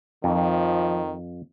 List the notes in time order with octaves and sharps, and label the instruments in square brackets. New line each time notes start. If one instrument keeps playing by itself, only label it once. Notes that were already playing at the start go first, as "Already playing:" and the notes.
[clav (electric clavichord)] F2 [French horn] D#3 [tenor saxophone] F3